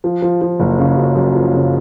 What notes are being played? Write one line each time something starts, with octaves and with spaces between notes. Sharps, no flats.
F3
F3
F3
F#1
C#3
F#2
F#2
F3
C#3